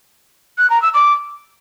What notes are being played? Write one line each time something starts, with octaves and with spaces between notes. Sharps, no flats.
F#6
A#5
E6
D6